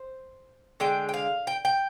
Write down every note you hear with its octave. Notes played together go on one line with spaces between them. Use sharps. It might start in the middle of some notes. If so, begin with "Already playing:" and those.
Already playing: C5
D3 G#3 G5
G5
F5
G5
G5